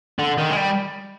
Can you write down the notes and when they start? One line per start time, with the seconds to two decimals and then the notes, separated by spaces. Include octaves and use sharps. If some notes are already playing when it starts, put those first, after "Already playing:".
0.19 D3
0.38 D#3
0.50 G#3
0.56 G3